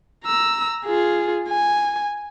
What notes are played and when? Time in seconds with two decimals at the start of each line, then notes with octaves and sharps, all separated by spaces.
0.25 A#5 E6
0.85 F4 G#4
1.49 G#5